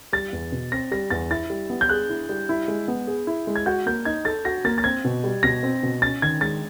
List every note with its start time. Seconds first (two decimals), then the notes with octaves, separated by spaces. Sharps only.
0.13 G3 A6
0.33 E2
0.52 B2
0.72 C4 A#6
0.91 G3 A#6
1.10 E2 A6
1.31 E4 A6
1.50 G3
1.70 B3
1.81 G6
1.89 G#4 F#6
2.09 E4
2.29 G3
2.49 E4
2.68 G#3
2.88 B3
3.07 G#4
3.27 E4
3.47 G#3
3.56 G#6
3.66 F#4 G6
3.86 A#3 G6
4.05 D#4 G#6
4.25 A4 A6
4.45 F#4 A#6
4.65 A#3 A6
4.78 A6
4.84 C4 G#6
5.04 B2
5.24 G3
5.43 B2 A#6
5.63 C4
5.83 B2
6.02 C#4 A6
6.22 D#3 G#6
6.41 G#3 A6